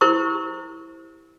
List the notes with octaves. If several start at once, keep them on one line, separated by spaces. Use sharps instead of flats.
E4 G4 A#4 C5 C#6